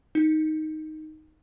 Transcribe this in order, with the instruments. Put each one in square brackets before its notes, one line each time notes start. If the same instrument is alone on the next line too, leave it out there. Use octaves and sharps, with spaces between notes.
[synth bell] D#4